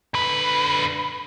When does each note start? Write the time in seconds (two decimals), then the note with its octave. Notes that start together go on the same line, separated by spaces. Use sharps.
0.14 D3 B4